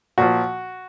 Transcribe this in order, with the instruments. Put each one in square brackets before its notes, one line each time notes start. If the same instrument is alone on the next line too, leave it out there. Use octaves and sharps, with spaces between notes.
[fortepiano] A#2 F3 F#4